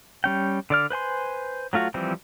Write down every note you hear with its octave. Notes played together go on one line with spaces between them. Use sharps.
G3 C#4 G5
D3 D5 F6
B4 C5 G#5 C6
F#3 A3 F4 F#4
E3 F3 G3 C4